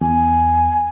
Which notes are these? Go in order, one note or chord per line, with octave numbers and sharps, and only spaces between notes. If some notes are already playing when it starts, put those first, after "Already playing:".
E2 G#5